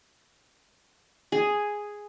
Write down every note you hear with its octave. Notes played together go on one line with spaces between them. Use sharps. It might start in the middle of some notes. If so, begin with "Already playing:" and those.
G#4